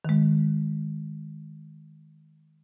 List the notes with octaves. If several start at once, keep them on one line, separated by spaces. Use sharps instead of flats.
D#3 G#3